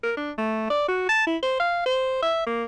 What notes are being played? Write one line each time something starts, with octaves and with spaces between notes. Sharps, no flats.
A#4
D4
A3
D5
F#4
A5
E4
C5
F5
C5
E5
A#3